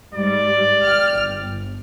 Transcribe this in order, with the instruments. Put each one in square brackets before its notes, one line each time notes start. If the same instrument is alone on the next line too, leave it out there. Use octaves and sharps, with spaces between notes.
[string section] G#2 G3 [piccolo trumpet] D5
[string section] G5 F6
G1